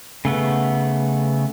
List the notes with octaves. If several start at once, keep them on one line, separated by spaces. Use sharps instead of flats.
C#3 A3 B3